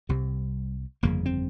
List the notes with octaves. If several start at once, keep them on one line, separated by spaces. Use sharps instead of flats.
C2 C3 G3
G1 F2 C#3 A#3
C4